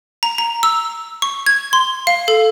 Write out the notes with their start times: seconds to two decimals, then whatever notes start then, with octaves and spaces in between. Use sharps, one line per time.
0.23 A#5
0.38 A#5
0.63 E6
1.22 C#6
1.46 G#6
1.73 C6
2.07 F5
2.28 A4